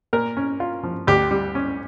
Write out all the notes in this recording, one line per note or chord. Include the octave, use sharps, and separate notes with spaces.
A#2 A#4
C#4
F4
F3
D2 G4
G3
C#4